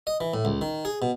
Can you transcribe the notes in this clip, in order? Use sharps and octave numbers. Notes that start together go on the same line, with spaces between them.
D#5
E3
A2
C#2
D#3
G#4
B2